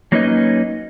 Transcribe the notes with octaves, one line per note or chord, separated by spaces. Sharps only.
F#3 A#3 C#4 D#4 B4 D#5